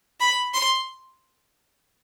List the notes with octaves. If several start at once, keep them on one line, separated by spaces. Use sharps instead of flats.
B5
C6